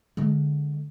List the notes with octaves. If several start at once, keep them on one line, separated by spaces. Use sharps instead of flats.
D3 G#3